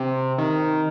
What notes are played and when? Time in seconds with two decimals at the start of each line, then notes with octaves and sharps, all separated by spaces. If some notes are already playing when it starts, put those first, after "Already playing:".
Already playing: C3
0.38 D#3